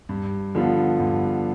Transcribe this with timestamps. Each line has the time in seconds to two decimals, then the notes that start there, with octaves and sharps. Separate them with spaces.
0.09 G2
0.55 D3 F3 B3 F4
1.00 G2